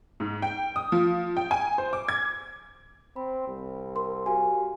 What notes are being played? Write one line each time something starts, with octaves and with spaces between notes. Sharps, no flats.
G#2
G5
D#6
F3
G5
G#5
C5
D6
G#6
C4 B5
C2
A#4 C6
F#4 G4 F5 G#5